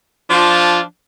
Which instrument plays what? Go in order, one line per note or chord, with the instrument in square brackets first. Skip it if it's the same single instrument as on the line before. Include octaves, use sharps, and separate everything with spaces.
[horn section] F3 D4 F4